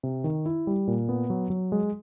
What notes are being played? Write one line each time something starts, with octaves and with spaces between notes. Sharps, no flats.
C3
D#3
E4
G3
A#2
B3
F#3
F#3
G#3